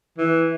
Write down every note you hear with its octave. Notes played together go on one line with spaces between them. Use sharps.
E3